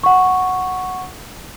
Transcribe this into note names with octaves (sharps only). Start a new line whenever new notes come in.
F#5 C#6